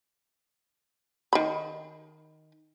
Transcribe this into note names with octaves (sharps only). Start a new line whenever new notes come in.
D#3 B5